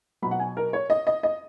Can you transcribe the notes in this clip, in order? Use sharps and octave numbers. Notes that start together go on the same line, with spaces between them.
B2 F#3 B5
F#5
G#5
A#4
C#5
D#5
D#5
D#5